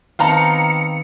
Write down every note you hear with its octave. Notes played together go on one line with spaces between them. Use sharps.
D#3 B3 C4 F5 A5 A#5 C#7